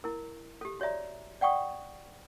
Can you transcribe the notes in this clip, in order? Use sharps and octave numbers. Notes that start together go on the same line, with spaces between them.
E4 A#4
G4 A4
F#4 C#5 D5 E5 A#5
D5 F#5 G5 C#6 D#6